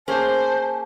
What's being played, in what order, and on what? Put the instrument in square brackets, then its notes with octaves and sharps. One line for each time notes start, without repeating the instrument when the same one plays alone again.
[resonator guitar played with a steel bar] A#3 C#4 G#4 [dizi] C5 [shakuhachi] A5